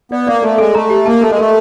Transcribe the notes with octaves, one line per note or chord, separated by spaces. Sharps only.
B3 D5
A#3 D5
A3 A4
G#3 A4
A3 A#5
G4
A#3 A5
A3 A4
G#3
A3 A#4